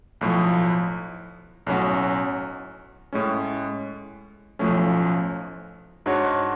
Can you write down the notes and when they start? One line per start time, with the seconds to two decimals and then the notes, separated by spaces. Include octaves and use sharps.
0.21 B1 A2 F3
1.66 B1 A2 F#3 C#4 F#4
3.13 A2 G#3 C#4
4.59 B1 A2 F3 A3 C#4
6.06 G#2 G#3 D4 F#4 C#5